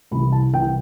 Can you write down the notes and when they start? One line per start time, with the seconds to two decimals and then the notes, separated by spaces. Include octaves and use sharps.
0.11 C2 C3 E3 B5
0.32 A5
0.53 C2 C3 E3 G5